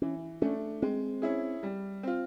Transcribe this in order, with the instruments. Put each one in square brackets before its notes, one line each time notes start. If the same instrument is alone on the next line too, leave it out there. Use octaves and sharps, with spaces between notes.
[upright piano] E3 [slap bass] C#4
[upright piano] A3 D4 [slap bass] C#4
[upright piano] G#3 [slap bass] C4
[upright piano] C#4 E4 G#4
G3
C4 F4